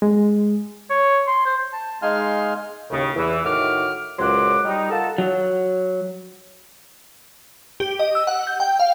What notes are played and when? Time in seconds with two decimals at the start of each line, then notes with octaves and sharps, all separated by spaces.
0.02 G#3
0.90 C#5
1.27 C6
1.46 C5
1.73 A5
2.02 G#3 D#4 F5 G#5 C6 F6
2.90 D#2 A2 C#3
3.15 E2 E3
3.44 A2 D#3 F#4 E5 D6 F6
4.19 C#2 A#2 F#3 C5 F#5 D6
4.64 G3 D#4
4.90 F4 A4 A#4 F#5 A5
5.18 F#3
7.80 G4
7.99 D#5
8.15 E6
8.27 F#5
8.47 G6
8.60 G5
8.80 F5